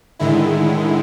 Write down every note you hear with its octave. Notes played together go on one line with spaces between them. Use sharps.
A2 D3 D#3 G#3 E4